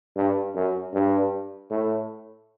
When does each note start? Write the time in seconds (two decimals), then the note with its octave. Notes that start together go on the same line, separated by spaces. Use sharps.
0.16 G2
0.55 F#2
0.94 G2
1.71 A2